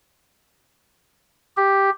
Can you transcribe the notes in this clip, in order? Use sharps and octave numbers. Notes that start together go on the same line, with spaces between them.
G4